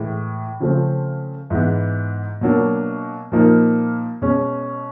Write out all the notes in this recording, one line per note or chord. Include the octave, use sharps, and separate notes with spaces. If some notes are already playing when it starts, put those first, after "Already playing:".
Already playing: A2 E3 G#3
C#3 F3 A3 C4
G#2 E3 G#3 B3
B2 F#3 A#3 D4
A#2 F3 A#3 D#4
B2 G#3 C#4